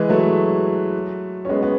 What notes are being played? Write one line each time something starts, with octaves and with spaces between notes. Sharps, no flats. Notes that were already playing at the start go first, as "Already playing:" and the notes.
Already playing: E3 G#3
F#3 A3
C#4
G#3 B3
B3